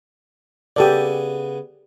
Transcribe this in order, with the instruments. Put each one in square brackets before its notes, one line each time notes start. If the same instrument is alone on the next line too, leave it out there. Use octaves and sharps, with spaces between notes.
[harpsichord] C#3 B3 G#5 [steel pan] G4 A4 D5